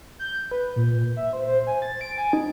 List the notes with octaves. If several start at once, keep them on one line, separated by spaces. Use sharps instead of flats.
G6
B4
A#2
E5
C5
C5
G#5
A6
D7
G#5
D#4